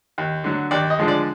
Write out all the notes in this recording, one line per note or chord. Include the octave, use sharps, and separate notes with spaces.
D#2
D3 F#3
D#2 D5
D#5
D3 F3 G#3
D5